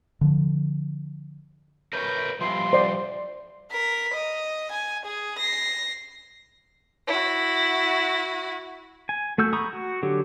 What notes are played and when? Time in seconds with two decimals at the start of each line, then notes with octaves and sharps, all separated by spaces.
0.21 D3 F3
1.93 A#4 B4 C#5 G6
2.41 F3 G3 E4 C6
2.73 C5 D5
3.71 A#4 B6
4.14 D#5
4.72 G#5
5.06 G#4
5.38 A#6 C7
7.07 E4 F#4
9.09 G#5
9.38 A3 F#4 E6 G6
9.53 A#5 B5 C#6 D#6
9.73 F#4
10.03 D3 F#3 G4